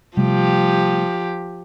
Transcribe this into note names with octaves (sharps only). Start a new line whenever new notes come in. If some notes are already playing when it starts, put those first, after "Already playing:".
C3 F3 G3 A3 G4